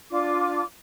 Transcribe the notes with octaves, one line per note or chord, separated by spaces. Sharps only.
D4 F4 D5 D6